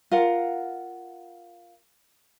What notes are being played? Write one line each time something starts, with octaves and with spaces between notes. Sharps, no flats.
F4 A#4 F#5